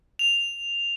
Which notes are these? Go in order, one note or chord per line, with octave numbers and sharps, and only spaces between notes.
F7